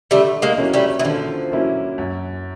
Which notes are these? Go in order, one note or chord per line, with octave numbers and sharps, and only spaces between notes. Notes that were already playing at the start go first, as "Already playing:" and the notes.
D3 G3 A3
G#3 A#3
F#3 A#3 C#4 E4
G3 A3
E3
D3 F3
F#3 A#3 C#4 E4
F#2